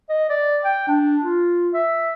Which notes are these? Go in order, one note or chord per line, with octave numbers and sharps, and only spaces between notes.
D#5
D5
G5
D4
F4
E5